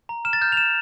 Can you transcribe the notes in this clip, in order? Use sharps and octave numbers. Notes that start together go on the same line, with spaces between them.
A#5
F6 E7
A6
F6 G6
F7
G6 E7